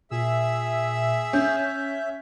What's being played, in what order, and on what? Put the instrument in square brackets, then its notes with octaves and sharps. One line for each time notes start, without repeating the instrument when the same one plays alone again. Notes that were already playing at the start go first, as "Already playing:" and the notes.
[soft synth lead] A#2 [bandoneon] G#4 E6 [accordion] E5
[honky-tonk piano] C#4 [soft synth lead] G6